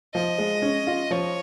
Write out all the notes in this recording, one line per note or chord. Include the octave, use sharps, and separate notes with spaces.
F3 D#5
G#3
C#4
F4
F3 C#5